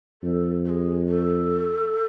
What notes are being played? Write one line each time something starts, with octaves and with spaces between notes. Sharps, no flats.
F2 A4
A4
G#4
A4